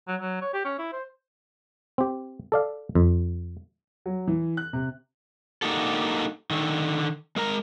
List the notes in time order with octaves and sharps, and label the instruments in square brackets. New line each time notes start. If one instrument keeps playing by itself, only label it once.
[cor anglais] F#3
F#3
C#5
G4
C#4
E4
C5
[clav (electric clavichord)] C4 G4
A4 D5 F5
F2
[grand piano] F#3
E3
F#6
C3
[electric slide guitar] A#3 D4 D#4 F#4 G4 A4
D3 D#3
G#3 A#4 A#5